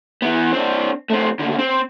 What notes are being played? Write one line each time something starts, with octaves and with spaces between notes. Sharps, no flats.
E3 B3
C4 D4
A3 C4
D#2 D3
C4